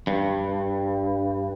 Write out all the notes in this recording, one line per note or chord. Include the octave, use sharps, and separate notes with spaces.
G2